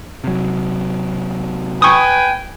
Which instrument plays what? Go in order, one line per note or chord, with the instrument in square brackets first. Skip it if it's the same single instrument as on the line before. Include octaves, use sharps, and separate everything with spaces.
[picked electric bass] C3 F#3
[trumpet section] B4 G5 G#5 [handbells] C#6 D#6